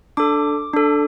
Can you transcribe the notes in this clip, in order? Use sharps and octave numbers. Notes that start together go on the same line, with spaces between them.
D4 A4 D6
D4 A4